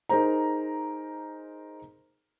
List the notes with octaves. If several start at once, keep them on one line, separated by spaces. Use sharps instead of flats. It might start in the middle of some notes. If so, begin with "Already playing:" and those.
D#4 G#4 A#4 C5 A#5